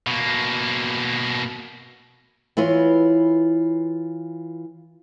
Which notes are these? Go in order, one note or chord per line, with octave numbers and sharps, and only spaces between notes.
B2 A#3
E3 E4 F4 B4 C#5